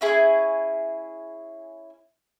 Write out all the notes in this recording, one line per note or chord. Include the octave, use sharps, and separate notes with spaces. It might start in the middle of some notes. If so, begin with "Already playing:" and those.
C#4 E4 G#4